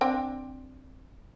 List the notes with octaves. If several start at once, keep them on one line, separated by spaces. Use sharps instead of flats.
C4 D4 G5